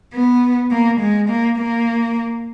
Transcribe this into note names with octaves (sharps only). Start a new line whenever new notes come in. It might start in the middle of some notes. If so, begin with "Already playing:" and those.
B3
A#3
G#3
A#3
A#3